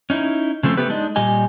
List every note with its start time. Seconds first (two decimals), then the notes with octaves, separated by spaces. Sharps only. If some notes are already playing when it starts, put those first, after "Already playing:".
0.10 C#4 D#4 E4
0.63 C#3 F3 A3 C4
0.77 A3 B3 G4 B4
0.89 G#3 D4 D#4 D#5
1.16 A#2 G3 G4 D#5 G#5